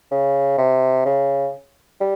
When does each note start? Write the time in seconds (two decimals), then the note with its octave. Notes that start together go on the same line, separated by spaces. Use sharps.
0.11 C#3
0.58 C3
1.05 C#3
2.01 G3